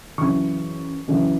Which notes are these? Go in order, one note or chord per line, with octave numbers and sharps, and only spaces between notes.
F#2 C#3 E3 C#6
F#2 C#3 E3